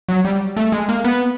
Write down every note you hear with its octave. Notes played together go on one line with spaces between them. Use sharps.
F#3
G3
A3
G#3
A#3
B3